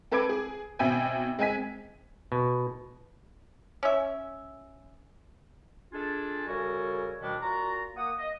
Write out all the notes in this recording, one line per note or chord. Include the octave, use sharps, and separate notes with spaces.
C4 A4 B4 D6 G#6 D7
G#4
G#1 B2 E5 G5 G#5
G#3 C4 G#5 B6
B2
C#4 E5
G#3 D4 F4 G#4 A4 G#5
C#3 G3 F#4 A4 A#4 G#5
D#2 B2 D#3 F3 G3 D4
A#2 F4 F#4 A#5
A#3 F#5 D#6
D#5